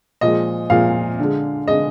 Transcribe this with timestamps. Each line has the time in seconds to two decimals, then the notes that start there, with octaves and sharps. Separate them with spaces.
0.21 A#2 F3 G#3 D#5
0.70 A#2 F3 G#3 F5
1.19 D3 G#3
1.68 D3 G#3 D#5